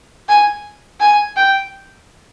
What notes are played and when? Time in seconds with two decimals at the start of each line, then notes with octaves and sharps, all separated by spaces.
0.29 G#5
1.00 G#5
1.36 G5